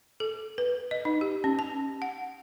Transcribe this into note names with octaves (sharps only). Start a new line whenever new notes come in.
A4
B4
D#5
D#4
G4
C#4
A5
F#5